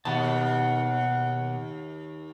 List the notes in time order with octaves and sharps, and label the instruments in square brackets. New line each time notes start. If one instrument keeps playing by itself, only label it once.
[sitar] D#2 [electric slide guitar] B2 A5 [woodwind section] F#5